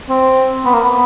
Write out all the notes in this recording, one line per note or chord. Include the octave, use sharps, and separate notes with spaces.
C4
B3
A#3
B3